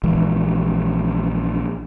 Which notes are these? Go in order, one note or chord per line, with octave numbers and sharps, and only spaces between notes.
A#1 E3 G#3